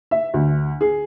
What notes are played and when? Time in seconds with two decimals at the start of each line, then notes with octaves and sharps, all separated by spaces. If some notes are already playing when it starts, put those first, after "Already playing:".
0.11 E5
0.34 D2
0.81 G#4